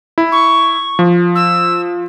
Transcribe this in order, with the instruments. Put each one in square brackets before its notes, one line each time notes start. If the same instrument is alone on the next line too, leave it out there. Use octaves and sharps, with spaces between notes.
[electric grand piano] E4
[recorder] C#6
[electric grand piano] F3
[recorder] E6